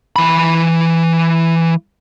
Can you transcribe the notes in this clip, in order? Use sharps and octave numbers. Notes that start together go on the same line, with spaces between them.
E3 B5